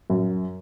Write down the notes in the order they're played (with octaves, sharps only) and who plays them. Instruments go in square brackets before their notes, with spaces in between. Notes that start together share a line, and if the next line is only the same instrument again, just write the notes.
[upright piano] F#2